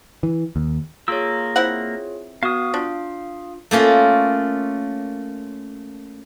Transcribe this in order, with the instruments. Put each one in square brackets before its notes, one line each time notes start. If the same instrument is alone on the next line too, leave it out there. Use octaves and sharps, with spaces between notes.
[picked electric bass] E3
D#2
[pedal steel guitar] A#3 E6 [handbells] F4 G#4 C#5
[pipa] C4 E4 F#5
[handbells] B3 F#4 [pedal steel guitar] F5 D#6
[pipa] D4 [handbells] F4
[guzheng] A3 A#3 C#4 F4